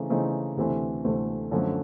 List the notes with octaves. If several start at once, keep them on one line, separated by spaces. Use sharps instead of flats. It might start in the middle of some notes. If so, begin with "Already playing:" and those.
Already playing: C#3 E3 A3 C4 D#4
C#3 E3 A3 C4 D#4
D2 C3 E3 A3 C4
D2 C3 E3 A3 C4
F#2 D3 F3 A3